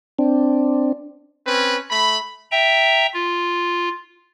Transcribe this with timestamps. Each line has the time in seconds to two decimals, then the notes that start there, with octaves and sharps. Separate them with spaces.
0.19 C4 D4
1.47 C4 C#4 B4
1.90 A3 B5
2.51 E5 G5 A#5
3.14 F4